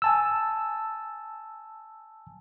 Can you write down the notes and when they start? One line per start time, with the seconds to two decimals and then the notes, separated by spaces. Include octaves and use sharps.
0.02 G#5 A5 E6